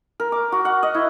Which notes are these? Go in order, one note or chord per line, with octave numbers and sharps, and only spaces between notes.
A#4
D6
F#4
F#5
D#5
E4